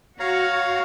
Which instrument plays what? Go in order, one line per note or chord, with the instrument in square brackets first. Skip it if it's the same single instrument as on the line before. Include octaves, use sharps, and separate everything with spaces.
[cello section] F#4 [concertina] C#5 F5 A#5